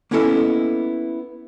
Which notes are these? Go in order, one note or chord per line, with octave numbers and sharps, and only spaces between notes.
A#3 B3 C#4 E4 A4 D#5